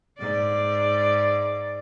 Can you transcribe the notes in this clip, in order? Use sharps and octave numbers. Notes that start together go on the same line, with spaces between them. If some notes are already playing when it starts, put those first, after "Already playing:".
G#2 D5